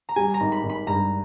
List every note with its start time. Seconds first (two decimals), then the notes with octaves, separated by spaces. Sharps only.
0.09 A#5
0.16 G3 G#5
0.34 A#5
0.40 G#1
0.52 B5
0.63 G#1
0.69 B5
0.87 G2 A#5